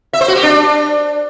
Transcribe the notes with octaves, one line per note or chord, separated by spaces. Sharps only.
E5
C5
F#4
G4
D4